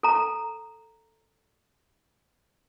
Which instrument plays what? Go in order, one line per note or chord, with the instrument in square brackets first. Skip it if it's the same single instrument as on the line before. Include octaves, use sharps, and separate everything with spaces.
[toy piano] A4 A#5